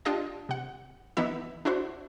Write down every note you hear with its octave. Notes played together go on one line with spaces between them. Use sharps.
D4 F4 G4 D#5 A5
C3 F#5
E3 B3 D#4 E4 E5
D4 E4 F#4 C5